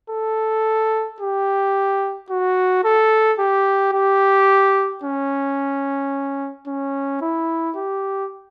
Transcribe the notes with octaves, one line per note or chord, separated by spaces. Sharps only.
A4
G4
F#4
A4
G4
G4
C#4
C#4
E4
G4